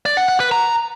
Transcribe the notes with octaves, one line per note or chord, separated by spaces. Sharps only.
D5
F#5
F#5
B4
A#5